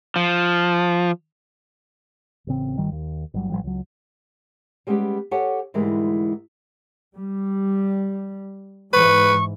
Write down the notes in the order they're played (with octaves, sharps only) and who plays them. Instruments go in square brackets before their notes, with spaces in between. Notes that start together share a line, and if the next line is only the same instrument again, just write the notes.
[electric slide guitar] F3
[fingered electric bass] A1 C#3 C4
G1 D#3 G3
D#2
G1 F#3 G3
A1 C#3 F3 G3
C#2 F#3
[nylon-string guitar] G3 G#3 B3 C#4 G4
G4 A4 C#5 F#5 G#5
D2 G#2 E3 G3 G#3 A#4
[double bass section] G3
[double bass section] G#2 E3 [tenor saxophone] B4 [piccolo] C#6